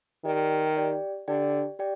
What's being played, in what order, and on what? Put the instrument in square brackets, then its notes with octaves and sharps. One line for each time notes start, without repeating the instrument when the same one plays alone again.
[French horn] D#3 [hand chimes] G4 D5 G5
[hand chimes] G4 D5 G5
[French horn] D3 [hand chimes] G4 D5 G5
[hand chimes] G4 D5 G5